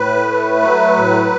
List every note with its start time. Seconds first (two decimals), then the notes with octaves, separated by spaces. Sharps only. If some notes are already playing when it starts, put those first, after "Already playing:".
Already playing: A2 B4
0.28 A3
0.62 F#3
0.97 A2